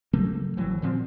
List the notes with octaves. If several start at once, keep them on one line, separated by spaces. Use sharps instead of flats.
C#3 F#3 A3 A#3
G#1 E3 F#3
A#2 D3 F3 C4